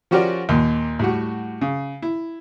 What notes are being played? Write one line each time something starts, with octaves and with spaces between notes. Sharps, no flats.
F3 C#4 F#4 G4 A#4 D5
D#2 A#2
A2 G3 F#4
C#3
E4